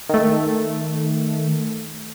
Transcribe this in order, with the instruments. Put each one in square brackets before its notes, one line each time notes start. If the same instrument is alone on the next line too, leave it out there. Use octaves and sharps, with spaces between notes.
[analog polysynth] D#3 A3